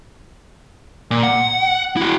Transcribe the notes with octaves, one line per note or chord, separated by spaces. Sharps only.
A#2
F#5
E4 F#4